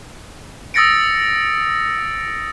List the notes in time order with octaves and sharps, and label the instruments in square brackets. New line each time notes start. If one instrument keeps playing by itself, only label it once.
[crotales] D#6 E6 A6 A#6 C#7 D7